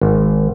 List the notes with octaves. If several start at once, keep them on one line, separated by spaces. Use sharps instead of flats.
G#1